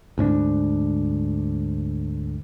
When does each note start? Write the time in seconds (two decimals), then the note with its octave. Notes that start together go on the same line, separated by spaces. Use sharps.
0.18 D2 G#2 C#4 D4